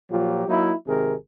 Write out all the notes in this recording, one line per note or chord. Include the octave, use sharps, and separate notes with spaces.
A#2 F3 F#3 F4 G4
F#3 A#3 D#4 E4
G#1 C3 D#3 G#4 A#4